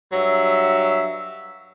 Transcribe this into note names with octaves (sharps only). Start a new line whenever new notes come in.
G2 F#3 E5